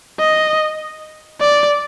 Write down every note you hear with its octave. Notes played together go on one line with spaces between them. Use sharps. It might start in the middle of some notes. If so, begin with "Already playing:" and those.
D#5
D5